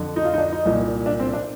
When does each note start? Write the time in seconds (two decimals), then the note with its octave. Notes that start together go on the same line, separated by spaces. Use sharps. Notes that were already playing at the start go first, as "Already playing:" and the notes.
Already playing: F2 D3
0.16 D#4
0.24 F4
0.33 D#4
0.38 D4
0.52 D#4
0.66 C2 A#2
1.06 D4
1.20 C4
1.33 D4